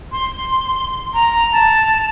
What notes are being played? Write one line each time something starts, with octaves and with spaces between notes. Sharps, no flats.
C6
A#5
A5